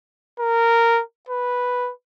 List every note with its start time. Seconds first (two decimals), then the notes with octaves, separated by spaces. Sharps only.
0.40 A#4
1.29 B4